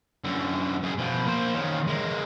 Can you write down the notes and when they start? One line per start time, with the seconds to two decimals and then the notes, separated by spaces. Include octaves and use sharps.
0.24 F#2 D3
0.83 F#2 G#4
0.98 B2 F3
1.27 A#3 C5
1.55 D#3 C#4
1.87 G#3 A#3